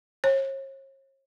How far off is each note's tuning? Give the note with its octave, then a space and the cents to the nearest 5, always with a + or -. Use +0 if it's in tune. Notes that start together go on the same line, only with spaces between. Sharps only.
C#5 -45